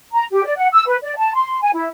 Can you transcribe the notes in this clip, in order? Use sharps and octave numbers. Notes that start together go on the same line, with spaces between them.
A#5
G4
D5
F#5
E6
B4
D5
A5
C6
G#5
E4